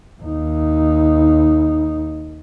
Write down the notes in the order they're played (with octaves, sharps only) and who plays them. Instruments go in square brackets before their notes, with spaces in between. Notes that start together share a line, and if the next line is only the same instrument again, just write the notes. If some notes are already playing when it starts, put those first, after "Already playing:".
[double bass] D#2 D#4